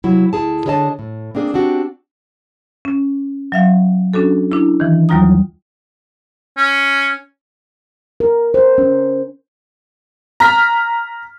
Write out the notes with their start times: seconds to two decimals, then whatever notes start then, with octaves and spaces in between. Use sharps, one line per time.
0.04 C3 F#3 E4
0.33 D2 E4 G#4 A5
0.66 D3 D4 G#4 C#5 D#5 A5
0.99 A2
1.35 A#3 C4 D4 G#4
1.54 C4 D4 F#4 G4
2.85 C#4
3.52 F#3 E5 F5
4.14 C#4 D4 F#4 A4
4.52 D4 E4
4.80 D#3 E3
5.09 D#2 F#3 G3 F4 A#5 D#6
6.58 C#4
8.20 A#4
8.54 C5
8.78 C#4
10.40 A#5 F6 B6